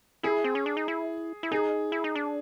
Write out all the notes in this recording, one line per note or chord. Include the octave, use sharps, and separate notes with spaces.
E4 G#4
C4
C#4
D4
D#4
E4
E4
D#4 G#4
E4
D#4
D4